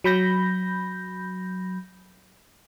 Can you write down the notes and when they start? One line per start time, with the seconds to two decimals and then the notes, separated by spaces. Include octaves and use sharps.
0.04 F#3 B5 G6 A#6